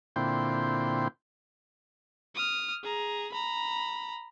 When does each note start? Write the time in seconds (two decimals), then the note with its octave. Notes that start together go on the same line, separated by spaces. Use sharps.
0.16 A#2 D3 C4 E4 G5 C6
2.35 D#6 F6
2.83 G#4 A#5
3.32 A#5 B5